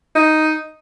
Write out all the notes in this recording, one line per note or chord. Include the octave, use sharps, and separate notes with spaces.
D#4